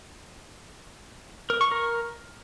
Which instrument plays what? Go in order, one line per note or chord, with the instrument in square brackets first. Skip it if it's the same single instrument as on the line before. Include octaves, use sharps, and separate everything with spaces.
[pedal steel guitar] A#4
C#6
A#4